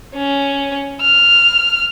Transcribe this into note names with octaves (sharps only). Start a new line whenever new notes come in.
C#4
F6